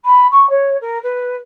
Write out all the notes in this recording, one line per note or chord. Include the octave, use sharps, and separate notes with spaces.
B5
C#6
C#5
A#4
B4